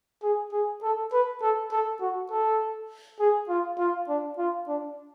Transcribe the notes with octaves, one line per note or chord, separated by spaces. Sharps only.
G#4
G#4
A4
B4
A4
A4
F#4
A4
G#4
F4
F4
D4
F4
D4